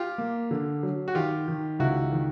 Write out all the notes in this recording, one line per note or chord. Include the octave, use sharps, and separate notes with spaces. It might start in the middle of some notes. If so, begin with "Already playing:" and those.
Already playing: F4 G4
A#3
D3
F#3
F#4
D#3 F4 G4
D#3
C#2 E4 F#4
D#3